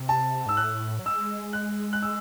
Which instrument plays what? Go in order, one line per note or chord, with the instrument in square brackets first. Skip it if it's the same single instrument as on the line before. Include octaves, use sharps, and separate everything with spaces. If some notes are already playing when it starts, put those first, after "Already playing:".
Already playing: [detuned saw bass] C3
[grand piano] A5
[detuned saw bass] G#2 [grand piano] E6
[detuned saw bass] A2 [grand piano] F#6
[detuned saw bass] F#3
[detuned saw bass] G#3 [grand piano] E6
[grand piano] F#6
F#6
E6